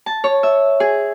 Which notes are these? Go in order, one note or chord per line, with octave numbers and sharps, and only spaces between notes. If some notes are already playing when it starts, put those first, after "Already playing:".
A5
C#5
E5
G#4